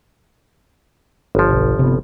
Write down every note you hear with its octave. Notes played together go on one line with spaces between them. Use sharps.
G1 F3
B1
C3 B3